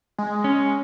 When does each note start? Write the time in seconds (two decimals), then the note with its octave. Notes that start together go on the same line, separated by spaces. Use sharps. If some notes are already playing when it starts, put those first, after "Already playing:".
0.18 G#3
0.44 C#4